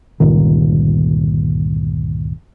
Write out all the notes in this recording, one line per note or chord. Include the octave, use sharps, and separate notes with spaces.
G1 C#2 A#2 D#3